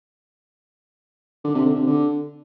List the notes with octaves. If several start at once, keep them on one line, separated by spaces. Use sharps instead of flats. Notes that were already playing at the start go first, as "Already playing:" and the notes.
D3
C3
D3
C3
D3